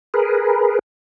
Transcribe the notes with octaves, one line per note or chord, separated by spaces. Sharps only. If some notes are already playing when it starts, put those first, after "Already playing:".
G#4 A#4 B4